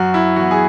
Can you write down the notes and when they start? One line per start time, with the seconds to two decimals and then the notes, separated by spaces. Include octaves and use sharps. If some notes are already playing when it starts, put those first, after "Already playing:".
Already playing: F#2 F#4
0.14 E4
0.36 E3 B3 F#4
0.51 G#4